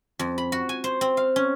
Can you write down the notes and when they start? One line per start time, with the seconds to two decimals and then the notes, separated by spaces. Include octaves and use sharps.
0.19 F2
0.38 B5
0.52 F#4
0.69 G#5
0.84 C5
1.01 C4
1.17 F5
1.36 C#4